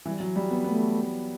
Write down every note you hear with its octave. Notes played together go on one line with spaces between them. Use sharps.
E3 G3
F#3
G3
B3
A3 B3